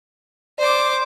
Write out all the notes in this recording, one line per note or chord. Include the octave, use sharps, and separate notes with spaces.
C5 D5 D6